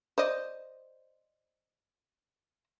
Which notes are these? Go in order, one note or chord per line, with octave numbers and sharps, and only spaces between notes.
C5 D5 D#5